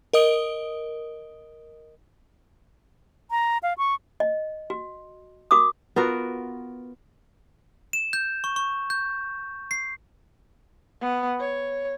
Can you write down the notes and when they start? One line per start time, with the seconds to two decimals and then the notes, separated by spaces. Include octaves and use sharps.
0.13 A#4 D#5 D#6 D7 G7
3.31 A#5
3.63 F5
3.78 C#6
4.20 D#5
4.70 F#4
5.51 F#4 A#4 D6 D#6
5.96 B3 F4 F#4 A#4
7.93 E7
8.13 G6
8.44 C#6
8.56 C#6
8.90 G6
9.71 C7
11.01 B3
11.40 C#5